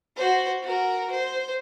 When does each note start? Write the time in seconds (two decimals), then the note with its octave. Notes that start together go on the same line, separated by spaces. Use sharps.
0.16 F#4 C5
0.62 F#4 A#4
1.12 C5